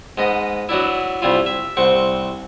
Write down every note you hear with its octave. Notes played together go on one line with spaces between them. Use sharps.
G#2 B3 D#5
F#3 B3 D4 E4
C2 G3 E4 F4
E5
C2 C4 F#5 C#6